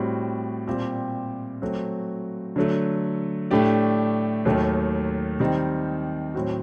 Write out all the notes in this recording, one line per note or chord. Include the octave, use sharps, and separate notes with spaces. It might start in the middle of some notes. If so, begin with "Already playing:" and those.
Already playing: A2 G3 C4 F#4
A#2 G3 C4 G4
F#3 A3 C4 F#4
D3 F#3 A3
A2 A3 D4 G4 D5
D#2 D#3 F#3 A3
D#3 G3 C4 D#4
A2 F#3 C4 F#4